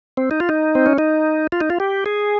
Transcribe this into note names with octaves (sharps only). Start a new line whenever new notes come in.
C4
D#4
F4
D#4
C4
C#4
D#4
F4
D#4
F4
G4
G#4